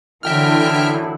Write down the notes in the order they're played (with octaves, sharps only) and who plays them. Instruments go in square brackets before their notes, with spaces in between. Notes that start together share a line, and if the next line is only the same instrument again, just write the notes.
[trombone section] F#2 A2 E4 [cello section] D3 E3 [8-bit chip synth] E5 G5 F6